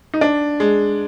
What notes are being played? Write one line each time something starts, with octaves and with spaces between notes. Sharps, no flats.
D#4
D4
G#3